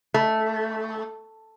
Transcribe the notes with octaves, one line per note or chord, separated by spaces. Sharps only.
A3